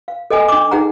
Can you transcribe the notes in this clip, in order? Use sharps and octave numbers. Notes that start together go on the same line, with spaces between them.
F5
A4 D#5 G#5 D#6
D4 D6
D#4 G#4 F#5 A#5